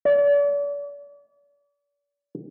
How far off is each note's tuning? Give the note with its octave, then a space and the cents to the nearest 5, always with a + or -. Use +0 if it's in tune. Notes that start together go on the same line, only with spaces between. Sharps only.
D5 -40